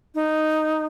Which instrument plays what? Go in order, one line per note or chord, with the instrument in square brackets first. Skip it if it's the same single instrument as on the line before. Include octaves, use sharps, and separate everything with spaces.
[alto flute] D#4